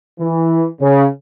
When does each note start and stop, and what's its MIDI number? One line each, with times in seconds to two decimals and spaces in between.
0.20 0.66 52
0.81 1.05 49